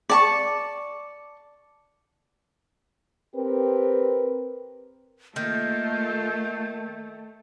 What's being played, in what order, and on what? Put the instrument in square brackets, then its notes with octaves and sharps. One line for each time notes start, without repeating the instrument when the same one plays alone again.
[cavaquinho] D5 A5 C#6
[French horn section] C4 G4 A#4 B4
[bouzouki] D#3 [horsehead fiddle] A3 A4 [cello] A#3 F4 [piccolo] G6